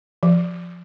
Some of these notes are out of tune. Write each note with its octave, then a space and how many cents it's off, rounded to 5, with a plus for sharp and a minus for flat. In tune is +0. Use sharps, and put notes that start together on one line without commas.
F3 +0